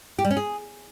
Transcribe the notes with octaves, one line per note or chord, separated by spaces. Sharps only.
G4
G3
C#4
G#4